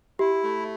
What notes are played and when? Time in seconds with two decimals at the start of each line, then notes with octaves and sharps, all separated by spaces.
0.19 E4 G4
0.43 A3